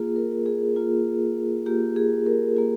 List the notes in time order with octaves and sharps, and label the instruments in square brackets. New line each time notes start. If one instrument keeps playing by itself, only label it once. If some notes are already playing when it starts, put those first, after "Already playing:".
Already playing: [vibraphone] A#3 F4 G#4
A#4
G#4
A#3 F4
A#3 F4 G4
G#4
A#4
A#3 F4 G#4